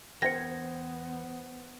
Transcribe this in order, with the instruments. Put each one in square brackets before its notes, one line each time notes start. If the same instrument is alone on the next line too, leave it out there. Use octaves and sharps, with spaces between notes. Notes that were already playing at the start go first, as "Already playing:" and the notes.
[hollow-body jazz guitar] E2 A#4 G5 [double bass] B3 [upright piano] C5 G#6 [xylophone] A#6 C#7